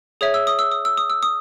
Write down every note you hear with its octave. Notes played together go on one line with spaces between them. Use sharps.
G#4 C#5 E5 D#6
E6
D#6
E6
D#6
E6
D#6
E6
D#6